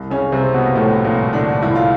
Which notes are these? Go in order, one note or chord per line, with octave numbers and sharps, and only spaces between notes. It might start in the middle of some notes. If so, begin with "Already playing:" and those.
Already playing: C2
C#3 C#4
C2 C3 C4
B2 B3
A#3
A2 F3 A3
A#2 A#3
C2
D3 D4
C2 E4
F4